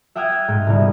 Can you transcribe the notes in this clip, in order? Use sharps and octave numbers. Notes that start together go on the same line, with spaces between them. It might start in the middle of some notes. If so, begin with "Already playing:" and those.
E5 F#5 G5 D#6 F6 G#6
G#2
G1 C2